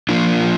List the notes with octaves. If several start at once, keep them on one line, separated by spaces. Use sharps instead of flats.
F3 A#3 D4 F4